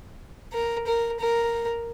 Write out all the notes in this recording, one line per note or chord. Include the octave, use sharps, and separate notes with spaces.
A#4
A#4
A#4